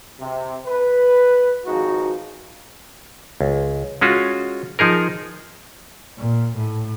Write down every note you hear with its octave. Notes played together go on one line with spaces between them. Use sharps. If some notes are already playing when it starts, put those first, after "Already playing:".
C3
B4
G#1 F3 D#4 F#4 G#4
C#2
G#3 C#4 F4 F#4
F3 D#4 G#4 A#4
A#2
A2